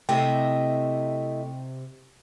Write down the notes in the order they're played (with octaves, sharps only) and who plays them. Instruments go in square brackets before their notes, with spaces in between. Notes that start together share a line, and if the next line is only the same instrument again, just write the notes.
[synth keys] C3 [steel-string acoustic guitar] A3 E4 D#5 [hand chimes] G5